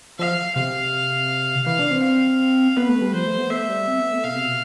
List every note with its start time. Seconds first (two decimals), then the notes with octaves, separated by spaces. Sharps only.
0.19 F3 F5
0.55 C3 F5
1.66 E3 F5
1.79 D4
1.91 C4
2.03 F5
2.76 B3 B4
2.89 A3
3.01 G3
3.14 F3 C5
3.26 A3
3.38 B3
3.50 A3 E5
3.69 G3
3.88 C4
3.99 B3
4.12 A3
4.24 B2 F5
4.35 C3
4.46 B2